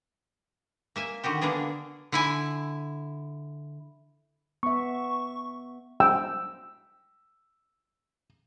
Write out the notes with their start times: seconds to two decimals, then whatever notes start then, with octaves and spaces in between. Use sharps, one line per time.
0.96 A#3 E5 G#5
1.24 D3 D#3 F#4 G4
1.41 D3 A#3 B3 D4 G#4
2.12 D3 E4 G#5
4.63 B3 E5 C#6
6.00 G5 E6